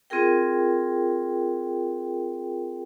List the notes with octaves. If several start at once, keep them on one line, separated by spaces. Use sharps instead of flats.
C4 F4 G#4 A#4 G5